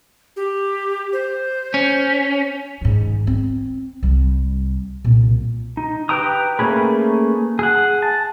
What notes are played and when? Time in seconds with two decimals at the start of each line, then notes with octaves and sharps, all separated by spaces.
0.36 G4
1.13 C5
1.74 C#4
2.81 G#2 D#3
3.27 C4
4.03 C2 G3
5.04 C2 A#2
5.77 D#4
6.09 G4 B4 G5 A#5 D#6
6.59 A3 A#3 C#4 G#4 B4
7.59 G#4 F#5
8.02 A5